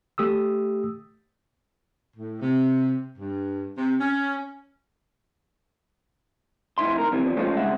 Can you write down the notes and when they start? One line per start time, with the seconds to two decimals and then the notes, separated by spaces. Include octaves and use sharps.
0.18 A3 G4 D#6 E6
2.17 A2
2.42 C3
3.18 G2
3.77 C3
4.00 C#4
6.78 F2 A2 D#4 E4 C6
6.98 A#4
7.11 F2 C3 E3
7.24 E2 F3
7.37 F3 G#3 A3 C#4 D#4 F4
7.57 C2 C#3 G#3 E5 F#5